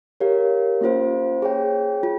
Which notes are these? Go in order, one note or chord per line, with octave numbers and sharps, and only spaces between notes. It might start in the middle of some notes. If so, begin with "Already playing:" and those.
G4 A#4 C#5 F5
A#3 C#4 F4 C5 F5
G#4 C#5 G5
F4